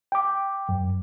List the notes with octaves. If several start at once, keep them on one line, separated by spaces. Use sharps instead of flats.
G5 D6
F#2